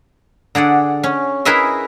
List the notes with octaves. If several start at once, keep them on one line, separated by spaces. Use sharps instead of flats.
D3 G#4 D5 F#5
C#4
E4 G#4 A#4 B4 D#5 E5